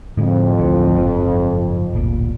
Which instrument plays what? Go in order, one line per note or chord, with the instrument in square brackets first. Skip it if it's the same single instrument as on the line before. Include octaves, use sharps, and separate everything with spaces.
[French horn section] F2 [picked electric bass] A2 D3 G#3
[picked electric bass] A1 D2 A2
F#1 G#2 F3
D1 G1 A#2